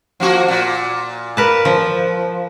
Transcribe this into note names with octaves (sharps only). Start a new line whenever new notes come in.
F3 A#3 F#4
A#2
A#4 B4 A5
F3